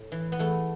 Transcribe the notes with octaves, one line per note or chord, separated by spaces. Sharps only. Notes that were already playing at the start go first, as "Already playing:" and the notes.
Already playing: A2
E3
B3
E2 A3